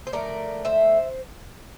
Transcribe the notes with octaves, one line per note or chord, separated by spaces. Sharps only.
C5
D3 F3 A3 A#4 D5
C5 E5